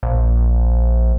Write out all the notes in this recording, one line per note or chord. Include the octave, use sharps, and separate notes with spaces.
A#1